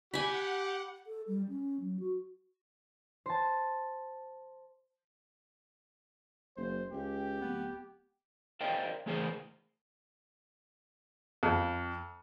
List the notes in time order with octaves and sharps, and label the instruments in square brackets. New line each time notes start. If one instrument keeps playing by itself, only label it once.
[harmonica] G4 [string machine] F#5 [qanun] G#5 B5
[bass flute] A4
G3
C#4
F#3
F#4
[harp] C5 A5
[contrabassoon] F#1 [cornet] C5
[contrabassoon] C#2 [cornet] G4
[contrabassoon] D1 [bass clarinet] B3
[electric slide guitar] A#4 C5 D5 D#5 F5 G5
C#3 E3 A3 G#4 A#4 C5
[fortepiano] F2